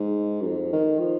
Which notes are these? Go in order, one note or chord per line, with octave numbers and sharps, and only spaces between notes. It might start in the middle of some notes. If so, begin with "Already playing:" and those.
Already playing: G#2
F#2
F2
D#3
F3